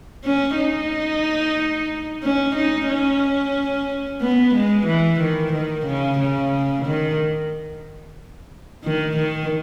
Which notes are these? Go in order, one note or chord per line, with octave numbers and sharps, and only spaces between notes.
C#4
D#4
C#4
D#4
C#4
B3
G#3
E3
D#3
D#3
C#3
C#3
D#3
D#3
D#3